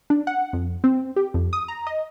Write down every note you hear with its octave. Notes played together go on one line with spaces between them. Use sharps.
D4
F#5
F2
C4
G4
F2
D#6
A#5
D#5